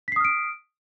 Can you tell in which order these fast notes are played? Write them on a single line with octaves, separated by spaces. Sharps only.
B6 C7 D#6 F6 D7